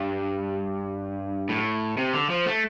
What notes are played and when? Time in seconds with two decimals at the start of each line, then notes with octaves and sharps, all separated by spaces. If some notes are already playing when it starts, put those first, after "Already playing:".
Already playing: G2
1.49 A2
1.98 C3
2.14 D3
2.30 F3
2.46 A3